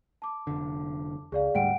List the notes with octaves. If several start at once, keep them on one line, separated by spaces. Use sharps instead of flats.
A5 D6
F1 D3
C#2 G#4 D5 F5
D2 G#2 G3 F#5 G5 D7